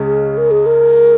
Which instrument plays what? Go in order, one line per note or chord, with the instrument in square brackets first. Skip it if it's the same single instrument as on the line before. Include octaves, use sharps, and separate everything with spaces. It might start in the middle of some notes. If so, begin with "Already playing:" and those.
Already playing: [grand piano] C#2 C#3 G#3 [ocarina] G#4
[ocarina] A#4
G#4
A#4